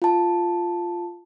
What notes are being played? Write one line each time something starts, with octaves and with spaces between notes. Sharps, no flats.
F4 A5